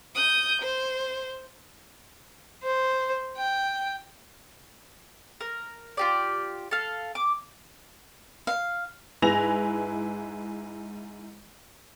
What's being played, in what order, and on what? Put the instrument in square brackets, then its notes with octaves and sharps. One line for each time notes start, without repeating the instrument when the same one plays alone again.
[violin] D#6 G6
C5
[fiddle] C5
G5
[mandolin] A#4
F4 G4 D5
A4 F5
D6
[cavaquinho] F5
[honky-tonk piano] G#2 E4 B4 G#5 A#6 F7